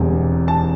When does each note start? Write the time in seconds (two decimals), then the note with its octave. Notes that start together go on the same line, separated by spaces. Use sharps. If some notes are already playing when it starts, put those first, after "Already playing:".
Already playing: E1 E2 D3 G3 C4
0.48 A5